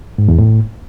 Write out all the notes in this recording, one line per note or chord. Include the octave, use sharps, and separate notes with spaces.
G#2
E2
A2